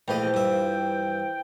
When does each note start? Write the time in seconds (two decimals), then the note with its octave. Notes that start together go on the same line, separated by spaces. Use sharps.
0.08 A#1 A2 E3 F3 D#5 G5
0.34 G2 E5